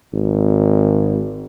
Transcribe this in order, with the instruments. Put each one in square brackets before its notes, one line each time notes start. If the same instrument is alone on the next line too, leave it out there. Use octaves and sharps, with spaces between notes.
[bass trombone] G#1